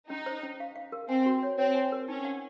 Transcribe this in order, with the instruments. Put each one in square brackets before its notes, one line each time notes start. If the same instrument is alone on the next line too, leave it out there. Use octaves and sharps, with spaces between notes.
[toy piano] C#4 [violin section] D#4
[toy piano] C5
C#4
F5
F5
A#4
[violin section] C4 [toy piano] G#5
[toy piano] F#4
C#5
[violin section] C4 [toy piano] C#5
[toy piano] G#5
A#4
[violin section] C#4 [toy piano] D#4
[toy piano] F#5